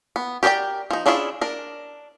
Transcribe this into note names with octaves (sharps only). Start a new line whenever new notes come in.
B3
G4 A#4 C5 D5 G5
F3 D#4
C#4 D4 E4 F4 G#4
D4 A#4